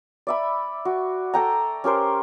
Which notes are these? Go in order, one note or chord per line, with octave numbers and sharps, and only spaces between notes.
D5 E5 B5
F#4
A4 G5 A#5
C#4 G4 A#4 C5